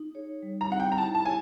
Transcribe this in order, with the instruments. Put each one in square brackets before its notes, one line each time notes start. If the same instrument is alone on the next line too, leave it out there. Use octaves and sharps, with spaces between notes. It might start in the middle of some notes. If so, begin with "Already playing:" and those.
Already playing: [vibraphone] D#4
G#4 C#5
G3
[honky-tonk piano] A#5
[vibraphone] C4 D#4 G#4 [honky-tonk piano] F#5
[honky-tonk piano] G5
A#5
[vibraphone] E4 [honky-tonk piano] A5
[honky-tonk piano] A5
[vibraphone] G#4 C#5 [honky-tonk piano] G#5